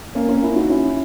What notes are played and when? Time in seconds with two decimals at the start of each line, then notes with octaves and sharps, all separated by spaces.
0.15 A#3 C#4
0.29 A#3 C#4
0.43 C#4 E4
0.56 D#4 F#4
0.70 C#4 E4